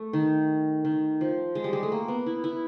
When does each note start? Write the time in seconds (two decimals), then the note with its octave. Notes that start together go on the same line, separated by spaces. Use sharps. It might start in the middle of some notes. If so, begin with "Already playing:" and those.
Already playing: A3
0.13 D#3
0.85 D#3
1.21 F3
1.55 G#3
1.64 G3
1.73 G#3
1.83 A3
1.92 A#3
2.08 B3
2.26 E4
2.44 E4